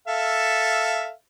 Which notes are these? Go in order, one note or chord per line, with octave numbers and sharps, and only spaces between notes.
A4 E5 F5